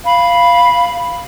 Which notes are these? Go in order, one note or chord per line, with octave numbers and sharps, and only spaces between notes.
F5 B5